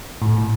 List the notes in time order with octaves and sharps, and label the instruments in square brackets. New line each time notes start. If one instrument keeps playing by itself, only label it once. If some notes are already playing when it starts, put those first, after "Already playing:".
[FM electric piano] A2